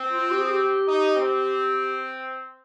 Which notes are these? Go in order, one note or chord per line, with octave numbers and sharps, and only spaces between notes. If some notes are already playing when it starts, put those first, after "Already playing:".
Already playing: C4
F4
G4
G#4
G4
D#4
C4